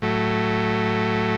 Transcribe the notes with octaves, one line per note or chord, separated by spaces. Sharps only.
A2 F#3 A3